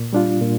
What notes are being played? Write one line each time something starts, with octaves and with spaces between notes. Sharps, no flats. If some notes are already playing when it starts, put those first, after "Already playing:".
Already playing: A#2
G3 D4 F4
A#2